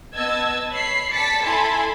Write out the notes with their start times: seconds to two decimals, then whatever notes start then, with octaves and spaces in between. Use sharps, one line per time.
0.14 B3 D#5 A5 E6 G#6
0.72 C#5 B5 C7
1.11 D5 A5 A6 B6 C#7
1.43 E4 A4 G#5 A5 B5 C6